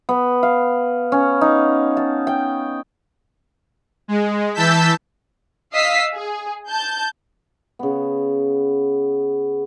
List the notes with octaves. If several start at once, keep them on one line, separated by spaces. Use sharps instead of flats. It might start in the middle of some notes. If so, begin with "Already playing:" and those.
B3
F5
C#4
D#4
A5
G5
G#3
E3 A5 E6 G6 B6
D#5 F5 D#6 E6 B6 C7
G#4
A5 G6
C#3 B3